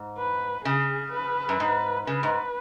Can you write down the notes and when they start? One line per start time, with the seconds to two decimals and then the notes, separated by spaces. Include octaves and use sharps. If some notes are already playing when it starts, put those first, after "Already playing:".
Already playing: G#2
0.17 B4
0.65 C#3 G#4
1.12 B4
1.49 F#2
1.60 G#2
2.07 C#3 B4
2.23 G#2